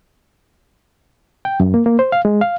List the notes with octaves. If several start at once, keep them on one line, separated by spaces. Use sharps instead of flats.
G5
F#2
A#3
A#3
C5
F5
G#3
F5